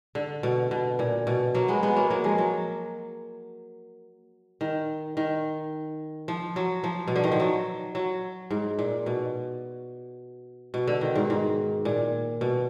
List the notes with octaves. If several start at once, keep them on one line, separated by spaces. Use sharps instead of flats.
D3
B2
B2
A#2
B2
F#3 A#3
G#3 B3
G#3 B3
F#3 A#3
F#3 A#3
F3 G#3
F#3
D#3
D#3
F3
F#3
F3
B2
D3
D#3
F3
F#3
F#3
G#2
A#2
B2
B2
D3
D#3
G#2
G#2
A#2
B2